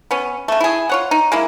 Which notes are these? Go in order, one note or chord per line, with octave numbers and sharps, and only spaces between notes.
B3 C#4
C#3 A3
E4 G#4
F4 C#5 F#5
D#4
G#3 A#3 E4